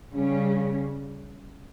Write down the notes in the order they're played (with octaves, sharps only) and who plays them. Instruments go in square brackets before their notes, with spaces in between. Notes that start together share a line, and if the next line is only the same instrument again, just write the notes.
[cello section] C#3 G3 C#4